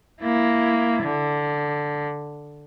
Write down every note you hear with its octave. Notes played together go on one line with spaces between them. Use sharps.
A#3 E4
D3